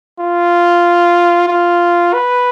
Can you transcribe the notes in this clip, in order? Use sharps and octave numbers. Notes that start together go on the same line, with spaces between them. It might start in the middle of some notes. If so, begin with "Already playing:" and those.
F4
F4
B4